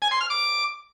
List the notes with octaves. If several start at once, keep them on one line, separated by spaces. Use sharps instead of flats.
G#5
C6
F6
D6